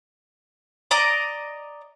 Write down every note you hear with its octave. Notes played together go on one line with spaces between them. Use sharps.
D5 D#5 A#5 D6